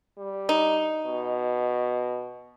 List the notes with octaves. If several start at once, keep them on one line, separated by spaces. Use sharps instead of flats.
G3
D#4
B2